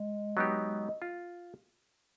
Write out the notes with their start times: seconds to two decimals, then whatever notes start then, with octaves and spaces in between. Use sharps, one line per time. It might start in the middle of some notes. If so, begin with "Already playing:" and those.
Already playing: G#3
0.37 F#3 B3 D#4 G4
1.02 F4